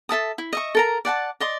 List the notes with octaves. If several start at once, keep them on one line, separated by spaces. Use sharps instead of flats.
A4 E5 A5 D#6
E4
D#5 E5 C#6
A4 A#4 A#5
D5 F#5 G#5 A5
D5 D#5 C6